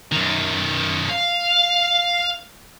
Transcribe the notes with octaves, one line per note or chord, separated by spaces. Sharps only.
F#2 D#3
F5